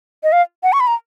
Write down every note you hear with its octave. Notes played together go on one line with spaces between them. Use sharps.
D#5
F5
F#5
C#6
B5
A#5